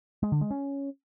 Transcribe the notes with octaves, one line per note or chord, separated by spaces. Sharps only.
G#3
D3
G#3
C#4